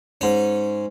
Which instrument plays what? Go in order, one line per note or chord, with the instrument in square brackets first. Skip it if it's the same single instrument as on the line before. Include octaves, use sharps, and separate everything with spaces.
[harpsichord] G#2 C#4